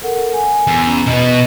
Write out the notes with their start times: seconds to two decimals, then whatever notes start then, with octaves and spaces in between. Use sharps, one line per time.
0.02 A4 A#4 F#5
0.33 G#5
0.67 E2
0.86 C#4 A#5
1.06 B2 B3 D#5